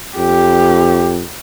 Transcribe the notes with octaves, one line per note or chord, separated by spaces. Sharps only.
F2 G4